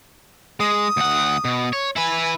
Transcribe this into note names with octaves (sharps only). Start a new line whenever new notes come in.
G#3 D#6
D2 F#5
B2
C#5
E4 B4 G#5